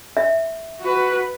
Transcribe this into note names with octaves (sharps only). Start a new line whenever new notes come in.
E5
F#4 B4